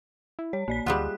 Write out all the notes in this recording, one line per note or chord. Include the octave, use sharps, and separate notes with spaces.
E4
G3 C#5
A#1 A#3 D5 B6
D2 G3 G#3 F4 F#5 F#6